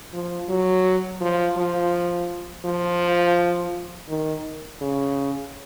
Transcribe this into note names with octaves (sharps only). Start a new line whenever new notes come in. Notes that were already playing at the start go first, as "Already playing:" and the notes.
F3
F#3
F3
F3
F3
D#3
C#3